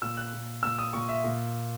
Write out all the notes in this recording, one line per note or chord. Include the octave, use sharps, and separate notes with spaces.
A#2 E6
F#6
A#2
A#2 E6
D#6
A#2 C#6
E5
A#2